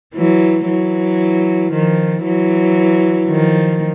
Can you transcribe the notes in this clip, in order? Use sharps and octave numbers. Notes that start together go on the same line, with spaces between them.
E3 F#3
E3 F#3
D#3 F3
E3 F#3
D#3 F3